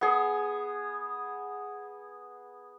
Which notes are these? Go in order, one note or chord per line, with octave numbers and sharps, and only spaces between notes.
B3 G#4